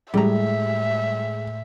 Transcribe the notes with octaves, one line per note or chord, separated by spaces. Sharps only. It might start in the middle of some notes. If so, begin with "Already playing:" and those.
A2 G3 G#3 E5 A#5